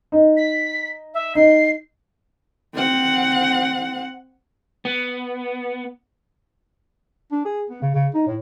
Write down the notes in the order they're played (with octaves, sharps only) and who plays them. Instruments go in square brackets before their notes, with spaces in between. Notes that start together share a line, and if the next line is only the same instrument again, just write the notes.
[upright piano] D#4
[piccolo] B6
E5
[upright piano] D#4 [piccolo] C7
[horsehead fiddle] C4 F#5
[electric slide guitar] B3
[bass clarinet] D4
G#4
B3
C#3
C#3
D#4
A2